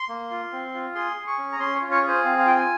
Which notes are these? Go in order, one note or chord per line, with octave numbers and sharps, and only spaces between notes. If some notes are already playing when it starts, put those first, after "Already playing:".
Already playing: C6
A#3
F4
C4
F4
G#4 C6
G#4
C#6
C#4
A#5
C#4 C6
C#5
F4
C#5
G#4
C5
C4 F5
F5
F4 G5
G#5